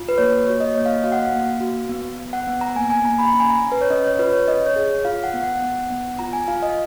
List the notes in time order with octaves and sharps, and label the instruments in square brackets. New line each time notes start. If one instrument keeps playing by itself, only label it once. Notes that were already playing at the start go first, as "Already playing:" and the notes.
Already playing: [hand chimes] F4
B4
A#3 C#5
F#4 C#5
D#5
A#3 C#5
F5
D#5
F#4 F5
F#5
F5
A#3
F#4
B3
B3
F#5
B3
A#5
A#3 G#5
G#5
A#3 A#5
B5
C#4 A#5
G#5
A#5
C#4
B4
C#5
C#4 D#5
C#5
F4 B4
C#5
C#4 D#5
C#5
G#4
F4 F5
F#5
B3
F#5
B3
B3
F4 A#5
G#5
F4 F5
D#5